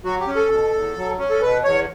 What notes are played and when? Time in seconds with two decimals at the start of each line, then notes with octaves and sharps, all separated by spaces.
0.04 F#3 F#4
0.20 G4
0.27 C#4
0.35 A4
0.51 B2
0.74 E2
0.97 F#3
1.19 C#4
1.30 A4
1.42 B2 B4
1.64 E2 C#5